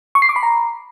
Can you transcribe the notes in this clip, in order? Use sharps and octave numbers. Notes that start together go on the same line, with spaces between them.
C#6
C7
D6
B5
A#5